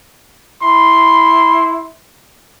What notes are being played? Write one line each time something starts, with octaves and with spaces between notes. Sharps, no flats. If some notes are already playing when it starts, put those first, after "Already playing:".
E4 B5 C6